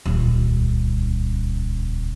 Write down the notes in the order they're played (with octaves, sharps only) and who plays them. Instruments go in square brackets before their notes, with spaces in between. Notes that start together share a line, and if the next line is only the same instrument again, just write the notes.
[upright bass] D#1 C#2